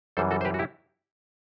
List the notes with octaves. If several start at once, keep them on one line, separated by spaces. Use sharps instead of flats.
F#2 E3 G3 A4 C5
F#4 A4
C5
G4 B4
F#4
E4 G4